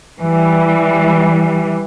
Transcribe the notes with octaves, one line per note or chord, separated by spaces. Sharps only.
E3 G3